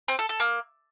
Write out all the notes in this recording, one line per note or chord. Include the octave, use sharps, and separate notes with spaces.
C4
A4
A4
A#3